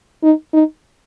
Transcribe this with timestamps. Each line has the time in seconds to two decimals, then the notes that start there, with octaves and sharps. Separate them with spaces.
0.23 D#4
0.54 D#4